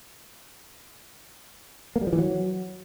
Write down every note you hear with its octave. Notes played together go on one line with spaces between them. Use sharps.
A#3
G3
F3
E3
F#3